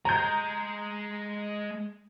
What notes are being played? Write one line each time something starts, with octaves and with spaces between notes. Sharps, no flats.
G#3 A#5 G6